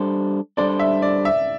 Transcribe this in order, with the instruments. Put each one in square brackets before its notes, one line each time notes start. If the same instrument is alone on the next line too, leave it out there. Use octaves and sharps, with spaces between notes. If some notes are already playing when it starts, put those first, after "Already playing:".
Already playing: [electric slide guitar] G3 D4 A4 C5
[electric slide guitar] G3 D4 A4 C5 [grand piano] D5
[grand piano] E5
D5
E5